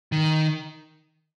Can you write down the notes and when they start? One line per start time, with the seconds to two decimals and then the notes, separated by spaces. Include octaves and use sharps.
0.12 D#3